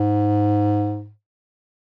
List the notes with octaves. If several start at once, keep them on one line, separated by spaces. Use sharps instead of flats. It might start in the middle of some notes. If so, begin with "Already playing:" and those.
Already playing: G#2